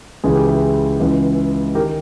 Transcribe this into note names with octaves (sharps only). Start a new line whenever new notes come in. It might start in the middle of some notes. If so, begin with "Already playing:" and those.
C#2 C#3 E3 G#4
G4
E4 G#4
C#2 C#3 E3
D#3 G4 A#4